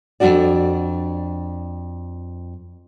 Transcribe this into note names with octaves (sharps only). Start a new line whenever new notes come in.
F2 B2 D4 F#4 D5